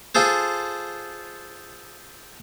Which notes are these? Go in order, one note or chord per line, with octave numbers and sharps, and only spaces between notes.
F4 G#4 A4 C5